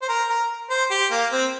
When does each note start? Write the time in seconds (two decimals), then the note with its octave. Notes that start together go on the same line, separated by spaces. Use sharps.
0.02 C5
0.09 A#4
0.29 A#4
0.70 C5
0.91 G4
1.11 A#3
1.32 C4